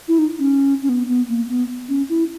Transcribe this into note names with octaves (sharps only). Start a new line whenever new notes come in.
E4
D#4
C#4
C#4
B3
B3
A#3
B3
C#4
E4